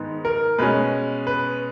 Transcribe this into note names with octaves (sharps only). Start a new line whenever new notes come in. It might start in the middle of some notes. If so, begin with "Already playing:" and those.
Already playing: G#2 D#3 G#3 B3
A#4
B2 G#3 C#4 B4
B4